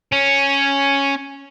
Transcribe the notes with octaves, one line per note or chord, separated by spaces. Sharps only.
C#4